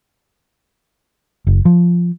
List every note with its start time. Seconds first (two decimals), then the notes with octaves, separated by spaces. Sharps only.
1.47 F#1
1.65 F3